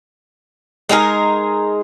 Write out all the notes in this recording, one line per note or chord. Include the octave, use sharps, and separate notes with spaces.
G#3 D#4 G#4 A#4